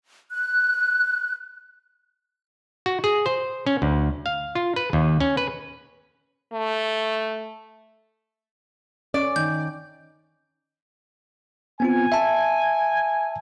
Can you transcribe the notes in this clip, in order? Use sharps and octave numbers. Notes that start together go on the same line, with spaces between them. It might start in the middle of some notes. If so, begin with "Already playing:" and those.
F#6
F#4
G#4
C5
C#4
D2
F5
F4
B4
D#2
C#4
B4
A3
C#4 D5
D#3 G6
B3 C4 F4 G#5
E5 A5